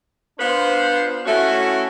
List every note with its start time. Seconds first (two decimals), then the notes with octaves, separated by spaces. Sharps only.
0.38 B3 D4 F4 B4 C5
1.26 A3 C#4 E4 F#4